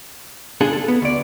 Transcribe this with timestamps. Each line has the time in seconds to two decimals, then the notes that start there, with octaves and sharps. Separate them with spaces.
0.61 D3 D4 F4 G#4 A4
0.73 A4
0.88 B3
1.02 D2 D5